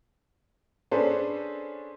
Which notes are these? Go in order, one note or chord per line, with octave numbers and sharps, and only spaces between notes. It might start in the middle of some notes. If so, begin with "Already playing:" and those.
C#4 D4 G#4 A4 B4 C5